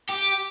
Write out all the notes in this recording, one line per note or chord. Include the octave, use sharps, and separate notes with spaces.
G4